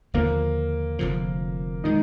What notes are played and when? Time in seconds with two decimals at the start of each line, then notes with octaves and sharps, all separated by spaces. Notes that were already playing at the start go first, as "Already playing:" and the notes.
0.14 D#2 D3 F3 A#3
0.99 F1 F2 D3 F3
1.84 D#3 G#3 D#4